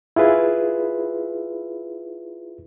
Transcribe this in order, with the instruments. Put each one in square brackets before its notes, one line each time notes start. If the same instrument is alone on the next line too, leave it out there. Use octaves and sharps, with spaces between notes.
[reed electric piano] E4 F4 G#4 B4